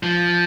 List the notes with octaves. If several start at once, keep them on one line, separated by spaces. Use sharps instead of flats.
F3